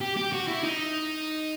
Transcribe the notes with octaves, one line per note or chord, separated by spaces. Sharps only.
G4
G4
F#4
E4
D#4